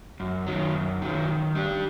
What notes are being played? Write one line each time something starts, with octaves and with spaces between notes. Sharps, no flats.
F#2
D#3 F#3
F#2
D#3 F#3
D#3
G3 D4 G4